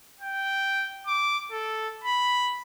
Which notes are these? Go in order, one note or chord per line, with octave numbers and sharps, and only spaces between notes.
G5
D6
A4
B5